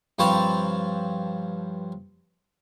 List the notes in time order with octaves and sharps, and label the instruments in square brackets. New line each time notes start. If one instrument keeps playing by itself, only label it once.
[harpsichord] G2 F3 C4 B4 C#5 A5